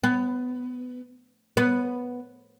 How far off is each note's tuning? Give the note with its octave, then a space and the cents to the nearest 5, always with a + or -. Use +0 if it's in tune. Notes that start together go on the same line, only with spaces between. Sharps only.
B3 +15
B3 -5